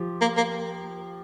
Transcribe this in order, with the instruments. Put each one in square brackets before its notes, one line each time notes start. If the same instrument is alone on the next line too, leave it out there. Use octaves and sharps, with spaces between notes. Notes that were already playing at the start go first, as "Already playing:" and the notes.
Already playing: [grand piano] F3 G4
[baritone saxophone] A#3
A#3